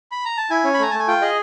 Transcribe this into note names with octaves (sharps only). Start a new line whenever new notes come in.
B5
A#5
A5
E4 G#5
C#4
B5
A3 A#5
A3 A5
G#5
F4 G5
G#4 D#5